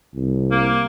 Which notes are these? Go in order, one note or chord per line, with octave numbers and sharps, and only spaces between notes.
C2
A#3